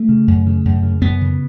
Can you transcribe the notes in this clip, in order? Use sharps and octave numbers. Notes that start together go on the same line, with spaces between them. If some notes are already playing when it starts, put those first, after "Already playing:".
Already playing: A3
C#3
F#2
C#3
F#2
C#3
F#2 B3
C#3